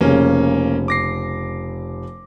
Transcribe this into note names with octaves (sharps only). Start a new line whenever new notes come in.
F1 C#3 A#3 C#4
D6 A#6 C7